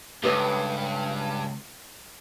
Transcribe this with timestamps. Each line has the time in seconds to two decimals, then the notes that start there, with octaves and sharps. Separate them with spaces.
0.23 C#2 G2 A4 B4 C#5